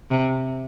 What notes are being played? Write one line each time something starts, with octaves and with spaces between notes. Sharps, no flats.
C3